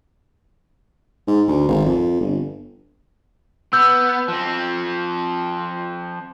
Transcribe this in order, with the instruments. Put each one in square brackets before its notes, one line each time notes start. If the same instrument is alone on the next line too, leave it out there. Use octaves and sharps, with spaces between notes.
[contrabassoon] G#2
D2
G#1
F2
G1
[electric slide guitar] B3 [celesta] E6 G6
[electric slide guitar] F3 C4